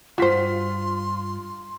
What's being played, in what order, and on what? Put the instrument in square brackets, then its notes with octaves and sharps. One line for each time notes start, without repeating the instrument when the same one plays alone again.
[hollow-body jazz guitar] D2 G2 [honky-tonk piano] F4 B6 [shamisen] F#4 C5 [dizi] C6